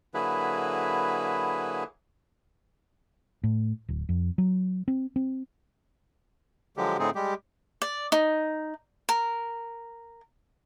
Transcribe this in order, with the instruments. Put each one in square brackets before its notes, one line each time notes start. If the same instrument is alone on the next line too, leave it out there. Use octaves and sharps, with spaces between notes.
[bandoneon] D3 F#3 A#3 E4 G#4 B4
[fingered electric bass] A2
D1
F2
F#3
C4
C4
[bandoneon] D3 F3 F#3 G#3 G4
A2 D3 A3 C4 D#4 G#4
G3 G#3 G4
[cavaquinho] D5
D#4
A#4